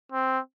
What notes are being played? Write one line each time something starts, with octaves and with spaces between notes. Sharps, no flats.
C4